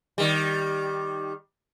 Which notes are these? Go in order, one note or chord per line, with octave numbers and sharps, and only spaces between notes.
D#3 G3